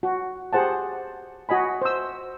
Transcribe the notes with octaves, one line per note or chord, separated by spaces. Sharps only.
F#4
G4 G#4 C5 F#5 A5
F#4 D#5 G#5 B5
C5 E6